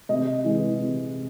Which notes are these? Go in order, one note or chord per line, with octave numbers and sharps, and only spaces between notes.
C3 D#5
E3 G#3
C3